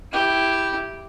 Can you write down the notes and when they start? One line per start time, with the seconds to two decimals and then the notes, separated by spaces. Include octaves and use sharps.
0.12 E4 G4